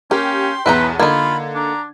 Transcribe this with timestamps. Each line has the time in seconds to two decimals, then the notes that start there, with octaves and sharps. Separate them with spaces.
0.11 A#3 C#4 G4 C6
0.66 B1 E2 B3 E4 B4 G5 A#5
0.99 D3 A#3 D#4 F4 B5 G#6
1.55 D4 A#5